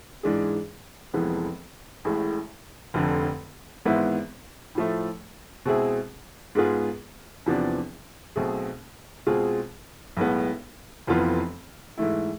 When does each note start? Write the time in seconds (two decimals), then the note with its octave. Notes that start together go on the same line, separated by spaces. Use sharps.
0.23 G#2 E3 G#3 D4 G#4
1.14 F1 F2 E3 G#3 B3
2.05 A1 A2 G#3
2.94 F1 F2 D3
3.85 G#1 G#2 E3 B3 E4
4.75 A2 F3 A3
5.65 B2 G#3 C4 E4 G#4
6.55 G#2 G#3 B3 F4 G#4
7.46 E2 C3 F3 B3 D4
8.36 B1 B2 A3 C4 G#4
9.27 B2 G#3 C4 F4 G#4
10.17 B1 A2 G#3 B3
11.07 F1 F2 E3 B3 F4
11.97 G#2 E3 A3 E4